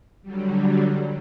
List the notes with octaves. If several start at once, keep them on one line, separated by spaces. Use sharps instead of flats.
D3 F#3 G3